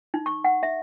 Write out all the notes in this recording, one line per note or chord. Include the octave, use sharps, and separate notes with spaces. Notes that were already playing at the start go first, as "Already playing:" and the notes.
D#4
C#6
F#5
E5